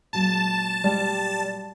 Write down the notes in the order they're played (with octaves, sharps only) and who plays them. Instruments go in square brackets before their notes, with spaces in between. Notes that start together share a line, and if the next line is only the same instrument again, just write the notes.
[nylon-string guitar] A#2 F#3 G#3 [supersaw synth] A5
[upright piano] G3 [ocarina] D5